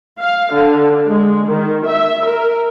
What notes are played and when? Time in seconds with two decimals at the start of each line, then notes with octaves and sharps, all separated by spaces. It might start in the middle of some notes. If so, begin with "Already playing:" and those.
0.19 F5
0.53 D3
1.07 G#3
1.47 D#3
1.85 E5
2.26 A#4